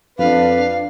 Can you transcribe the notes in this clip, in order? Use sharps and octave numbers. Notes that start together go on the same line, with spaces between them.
F2 D4 B4 F5